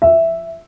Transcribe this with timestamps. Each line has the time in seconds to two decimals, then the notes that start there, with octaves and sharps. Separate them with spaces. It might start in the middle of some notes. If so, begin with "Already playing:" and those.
0.02 E5